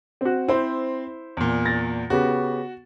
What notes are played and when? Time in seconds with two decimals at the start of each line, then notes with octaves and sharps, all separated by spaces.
0.21 C4 F#4
0.48 C4 E4 C5
1.37 E2 A#2
1.65 A6 A#6
2.10 C#3 B3 F#4 G4